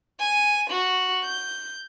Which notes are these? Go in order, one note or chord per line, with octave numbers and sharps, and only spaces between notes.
G#5
F#4
G6